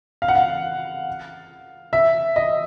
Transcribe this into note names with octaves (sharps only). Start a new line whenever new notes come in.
F5
F#5
F5
E5
D#5